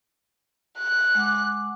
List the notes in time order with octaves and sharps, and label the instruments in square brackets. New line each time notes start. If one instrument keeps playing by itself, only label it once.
[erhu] F#6
[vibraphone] G#3 F#5 D6